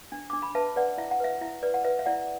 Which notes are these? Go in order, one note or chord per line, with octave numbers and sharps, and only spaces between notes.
D4
D4 D6
B5
B4 E5 A5
B4 D5 F#5
E4 E5
F#5
B4 E5
E4 E5
B4 D5
F#5
B4 E5
E5
E4 D5 F#5